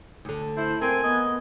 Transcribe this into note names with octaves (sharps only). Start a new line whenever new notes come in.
D2 D3
E4 C5
A#3 C4 G#5
B3 D#5